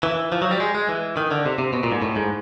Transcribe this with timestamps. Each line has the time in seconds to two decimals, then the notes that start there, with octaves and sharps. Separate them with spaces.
0.03 E3
0.32 F3
0.42 F#3
0.51 G3
0.60 G#3
0.75 G#3
0.89 E3
1.17 D#3
1.31 D3
1.46 C3
1.59 C3
1.73 B2
1.83 A#2
1.92 G#2
2.02 A2
2.16 G#2